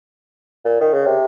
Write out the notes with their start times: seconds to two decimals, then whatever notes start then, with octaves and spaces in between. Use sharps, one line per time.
0.65 A#2
0.81 D#3
0.93 C#3
1.06 C3